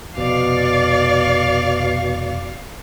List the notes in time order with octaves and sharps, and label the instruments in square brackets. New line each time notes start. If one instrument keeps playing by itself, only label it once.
[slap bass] F1 [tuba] B2 [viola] D5 [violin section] F5 C#6